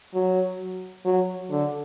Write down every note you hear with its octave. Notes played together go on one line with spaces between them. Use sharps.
F#3
F#3
D3